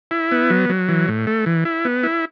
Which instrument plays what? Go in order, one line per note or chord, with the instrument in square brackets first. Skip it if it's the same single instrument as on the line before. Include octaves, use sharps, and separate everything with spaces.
[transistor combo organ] E4
B3
F#3
F#3
E3
A2
A3
E3
E4
B3
E4